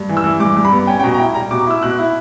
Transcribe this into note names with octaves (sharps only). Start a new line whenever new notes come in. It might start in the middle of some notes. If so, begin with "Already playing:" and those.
Already playing: G2
E3
E6
E3
G2 D6
G2
B5
B3
C#4 G5
G5
B2 A#5
A#5
E4 G5
G3 A#5
B2 D6
E4 E6
B2 F#6
E4